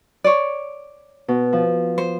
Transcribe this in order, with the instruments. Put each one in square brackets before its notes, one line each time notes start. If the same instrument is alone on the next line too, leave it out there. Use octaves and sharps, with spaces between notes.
[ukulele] C#5 D5
[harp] B2
F3
[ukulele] C5